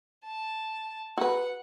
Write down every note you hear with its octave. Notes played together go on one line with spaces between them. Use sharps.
A5
F#4 B4 F#5